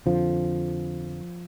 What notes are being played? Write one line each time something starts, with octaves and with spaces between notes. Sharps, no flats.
F2 D3 F3